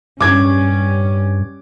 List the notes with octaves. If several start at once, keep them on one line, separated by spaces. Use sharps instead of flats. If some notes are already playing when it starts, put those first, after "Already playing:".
G2 G3 C#4 D6 G#6